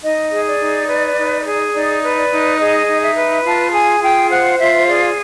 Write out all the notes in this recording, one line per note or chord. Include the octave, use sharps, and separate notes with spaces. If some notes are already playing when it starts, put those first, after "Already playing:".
D#4 D#5
G#4
D5
D#4
B4
D#4
G#4
D#4 D5
B4
D5
D#4
G#4 D#5
D#4
E5
B4
F4 A5
G#4 G#5
F4 G5
C5 F#5
F4 E5
G#4 D5